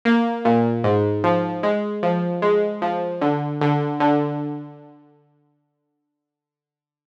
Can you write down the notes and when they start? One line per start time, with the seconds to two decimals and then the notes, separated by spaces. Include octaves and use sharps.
0.05 A#3
0.45 A#2
0.84 G#2
1.24 F3
1.63 G#3
2.03 F3
2.42 G#3
2.82 F3
3.21 D3
3.61 D3
4.00 D3